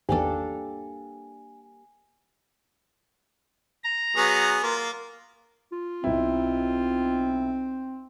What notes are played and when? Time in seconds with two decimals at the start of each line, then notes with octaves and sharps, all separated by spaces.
0.09 G#1 E2 A#3 D4 G4 A4 G#5
3.84 A#5
4.16 F#3 B3 G#4
4.63 A#3 F4
5.72 F4
6.04 B1 C4 E4